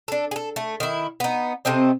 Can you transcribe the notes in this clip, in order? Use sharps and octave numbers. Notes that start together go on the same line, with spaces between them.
D4 A4
G#4 A4
A3
D#3 E4
B3 D#4
C3 A3 C4 D#5